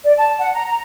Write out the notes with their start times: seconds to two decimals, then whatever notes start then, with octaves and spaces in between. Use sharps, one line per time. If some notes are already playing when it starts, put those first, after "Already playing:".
0.04 D5
0.17 A5
0.39 F#5
0.55 A#5
0.67 A#5